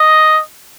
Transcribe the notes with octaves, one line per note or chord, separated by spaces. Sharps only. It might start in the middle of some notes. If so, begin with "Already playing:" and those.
Already playing: D#5